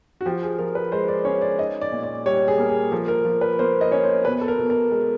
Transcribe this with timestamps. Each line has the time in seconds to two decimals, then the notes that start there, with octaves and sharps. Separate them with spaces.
0.21 F#4
0.26 F3 G4
0.43 G#4
0.58 F3 A#4
0.75 B4
0.92 G#3 C5
1.08 D5
1.25 C#4 C#5
1.41 D5
1.59 D#4 D#5
1.81 D5
1.92 A#2
2.03 D5
2.26 G3 C#5
2.48 G#4
2.58 A#3
2.69 G#4
2.92 F3 A4
3.08 A#4
3.25 F3
3.41 B4
3.59 A#3 C5
3.81 D#5
3.91 C#4 C#5
4.04 C5
4.25 B2 B4
4.41 A4
4.48 A#4
4.58 B2
4.70 A#4
4.91 G#3